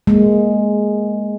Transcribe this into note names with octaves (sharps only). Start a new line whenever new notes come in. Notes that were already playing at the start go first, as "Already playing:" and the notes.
G#3 A#3